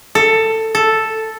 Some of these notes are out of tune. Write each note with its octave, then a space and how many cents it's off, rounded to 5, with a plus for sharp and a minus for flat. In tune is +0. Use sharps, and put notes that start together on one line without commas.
A4 +15
A4 +0